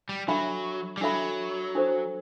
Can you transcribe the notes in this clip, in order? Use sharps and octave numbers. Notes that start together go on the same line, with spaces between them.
G3
F#3 D4 A4 E5 B5
G3
F#3 D4 A4 E5 B5
D4 A4 C5